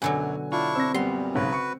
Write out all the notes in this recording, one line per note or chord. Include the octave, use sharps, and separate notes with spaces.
F#2 B2 D3 F#3 G#5
D4 E4 F4 C#6
C4 E6 A#6
F#2 A#2 G3 B3 C6
B1 G#2 C#3 F#4 B4
C#6 C#7